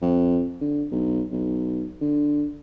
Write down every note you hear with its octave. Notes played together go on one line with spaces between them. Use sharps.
F2
D3
B1
B1
D3